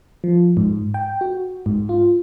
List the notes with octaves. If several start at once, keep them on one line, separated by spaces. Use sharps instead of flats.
F3
G#2
G5
F#4
G#2
F4